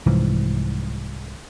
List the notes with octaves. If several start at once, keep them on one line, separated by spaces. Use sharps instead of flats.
C2 G#2 E3 F3